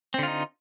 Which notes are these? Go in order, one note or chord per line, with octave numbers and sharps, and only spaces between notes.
D3 C4 D#4 F4